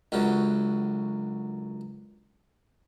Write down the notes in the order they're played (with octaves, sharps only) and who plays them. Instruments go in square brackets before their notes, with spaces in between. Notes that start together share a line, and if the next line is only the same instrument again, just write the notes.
[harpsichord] C#2 F#2 D3 F#3